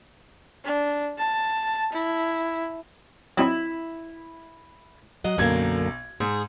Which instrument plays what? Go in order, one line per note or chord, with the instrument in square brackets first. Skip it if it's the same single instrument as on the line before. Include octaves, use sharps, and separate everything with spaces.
[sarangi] D4
A5
E4
[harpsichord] F#3 C4 D#4 [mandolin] E4
[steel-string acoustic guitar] F#3 D#5 F#5
[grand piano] B1 G#6 [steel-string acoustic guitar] F#2 D3 A#3
[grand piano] G#2 [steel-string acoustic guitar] G#4